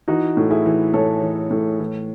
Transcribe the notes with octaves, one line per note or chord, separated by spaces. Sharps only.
E3 D#4 F#4
A2
E4 G#4
E3
A2 A4 C#5
E3
A2
E3